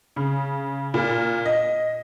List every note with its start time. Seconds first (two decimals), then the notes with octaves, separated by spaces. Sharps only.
0.16 C#3
0.94 A#2
1.46 D#5